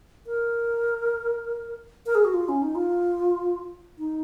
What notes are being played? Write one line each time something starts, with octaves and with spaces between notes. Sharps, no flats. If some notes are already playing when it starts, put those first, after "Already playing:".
A#4
A#4
G#4
F#4
F4
C#4
D#4
F4
D#4